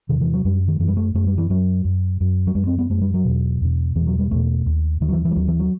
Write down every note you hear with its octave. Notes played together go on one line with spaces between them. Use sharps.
E2 C3 D#3
E3
F#3
F#2 G3
D#3
F#2 E3
G3
A3
F#2 A3
G3
E3
F#2 F#3
F#2
F#2
F#3
F#2 G3
C4
B3
F#2 A3
G3
F#3
E2 B2
E2 B2
E2 B2 E3
F#3
G3
E2 B2 A3
D#2
D#2 D#3
F#3
E3
E3
G3
D#2 F#3
E3
F#3